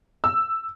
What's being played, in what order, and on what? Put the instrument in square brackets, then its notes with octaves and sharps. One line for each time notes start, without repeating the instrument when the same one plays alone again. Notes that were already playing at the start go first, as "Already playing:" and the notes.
[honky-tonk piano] E6